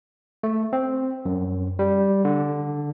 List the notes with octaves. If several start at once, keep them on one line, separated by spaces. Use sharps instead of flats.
A3
C4
F#2
G3
D3